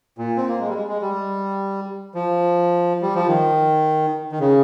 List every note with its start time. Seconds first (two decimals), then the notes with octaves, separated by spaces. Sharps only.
0.18 A#2
0.37 C4
0.48 A#3
0.60 G#3
0.69 G3
0.73 G#3
0.88 G#3
1.02 G3
2.14 F3
3.02 G3
3.15 F3
3.27 D#3
4.32 D#3
4.40 C#3